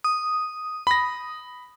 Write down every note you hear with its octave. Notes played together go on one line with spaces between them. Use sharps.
D#6
B5 A#6